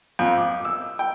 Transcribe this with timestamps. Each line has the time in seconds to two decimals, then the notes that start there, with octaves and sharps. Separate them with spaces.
0.19 F2
0.38 D6
0.65 E6
0.99 G5